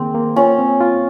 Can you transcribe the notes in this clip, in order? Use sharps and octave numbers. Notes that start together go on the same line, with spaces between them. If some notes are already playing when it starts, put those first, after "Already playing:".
Already playing: D#3 A#3 C4 G#4
A#3
C#4 F4
C4
F4